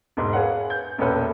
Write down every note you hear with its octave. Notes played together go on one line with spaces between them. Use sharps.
E1 G#2
G#4 B4 C#5 F5 F#5
G6
E1 A#1 C#4 A4 B4 E5